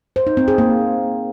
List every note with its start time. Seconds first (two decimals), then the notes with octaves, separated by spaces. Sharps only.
0.16 C5
0.27 D#4
0.37 C4
0.48 G#4
0.58 A#3